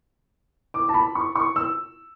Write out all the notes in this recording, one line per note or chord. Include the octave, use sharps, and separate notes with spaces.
D6
A5
B5
C#6
C#6
E6